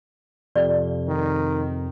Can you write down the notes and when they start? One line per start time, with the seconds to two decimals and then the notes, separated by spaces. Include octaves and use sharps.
0.56 F2 C3 D5
1.08 D#3